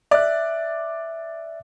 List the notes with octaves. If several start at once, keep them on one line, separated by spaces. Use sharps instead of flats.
D5 E5 F#6